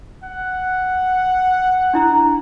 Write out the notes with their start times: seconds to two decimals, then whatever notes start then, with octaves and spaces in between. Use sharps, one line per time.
0.24 F#5
1.93 D4 E4 A#5